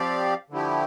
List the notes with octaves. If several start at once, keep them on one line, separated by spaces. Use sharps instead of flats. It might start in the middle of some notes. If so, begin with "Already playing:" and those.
Already playing: F3 C4 G4 D5 F5
D3 F3 A3 E4 G4